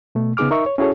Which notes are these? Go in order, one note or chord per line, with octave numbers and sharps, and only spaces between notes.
B2 A3
C#3 B3 D#4 G#4 D6 F6
D#4 A#4 E5 C#6
C#5
C#4 E4 F#4 G#4 A4 C#5